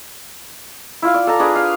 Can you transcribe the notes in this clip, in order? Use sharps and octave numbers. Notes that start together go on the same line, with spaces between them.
E4 F4 F5
D5
A4 A5 A#5
D4 G#4 B4 D6
F5